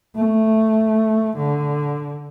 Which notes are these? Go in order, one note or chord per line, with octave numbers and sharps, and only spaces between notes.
A3
D3